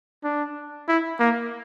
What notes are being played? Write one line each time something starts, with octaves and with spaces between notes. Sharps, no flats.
D4
E4
A#3